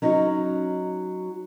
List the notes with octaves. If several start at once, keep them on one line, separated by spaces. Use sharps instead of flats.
F#3 C#4 D#4